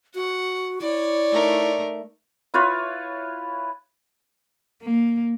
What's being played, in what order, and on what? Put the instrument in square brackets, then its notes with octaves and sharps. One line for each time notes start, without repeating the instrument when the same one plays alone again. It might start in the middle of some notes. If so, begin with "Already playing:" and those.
[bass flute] F#4 [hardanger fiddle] F#5
[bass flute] E4 [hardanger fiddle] C#5 D5
[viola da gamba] A3 D#4 A#4
[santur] E4 F4 B4 C#5
[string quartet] A#3